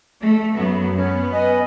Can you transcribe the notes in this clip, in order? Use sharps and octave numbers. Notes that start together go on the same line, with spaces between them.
A3
F#2 F#3 B3
B3 C#4
B4 D#5 G#5